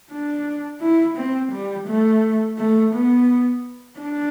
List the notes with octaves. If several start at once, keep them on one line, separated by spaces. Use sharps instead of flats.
D4
E4
C4
G3
A3
A3
B3
D4